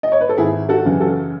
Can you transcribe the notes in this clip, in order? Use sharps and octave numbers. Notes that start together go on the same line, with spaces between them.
D#5
C#5
B4
A4
G#1 E4 G#4
F#4 A4
F#2 C#3 E3
F#4 A4